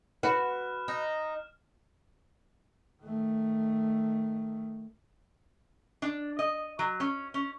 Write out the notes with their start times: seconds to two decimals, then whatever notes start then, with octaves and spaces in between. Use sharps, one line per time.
0.23 F#4 B4 F6 E7
0.88 D#4
3.03 D#3 A3
6.02 D4
6.39 D#5
6.79 F#3
7.00 C#4
7.34 C#4